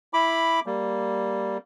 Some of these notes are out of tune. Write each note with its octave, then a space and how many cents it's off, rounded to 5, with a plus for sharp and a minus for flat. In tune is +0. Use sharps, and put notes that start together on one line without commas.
E4 +0 B5 +0 D6 +0
G3 +0 A#3 +0